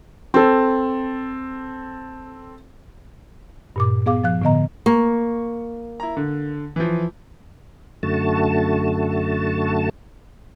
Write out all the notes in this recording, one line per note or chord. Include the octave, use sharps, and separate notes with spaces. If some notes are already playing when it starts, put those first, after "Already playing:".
C4 A4
G2 A#2 D6
B3 G#4 F5 D6
F3 F5 F#6
A2 D3 B3 D#5 A#5
A#3 C#6
E4 A#5
D3
E3 F3
F#2 D3 A3 F#4 A5